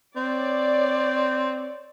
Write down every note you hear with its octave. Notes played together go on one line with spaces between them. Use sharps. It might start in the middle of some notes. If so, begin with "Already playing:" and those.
C4 C#5 D5